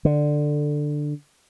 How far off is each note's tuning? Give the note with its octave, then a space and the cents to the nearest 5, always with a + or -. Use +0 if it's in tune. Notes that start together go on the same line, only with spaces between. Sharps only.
D3 +10